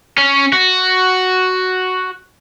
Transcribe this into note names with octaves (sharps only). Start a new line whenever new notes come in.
C#4
F#4